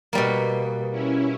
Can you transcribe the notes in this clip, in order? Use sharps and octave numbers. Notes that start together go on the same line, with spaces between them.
B2 G3 A#3
C#4 E4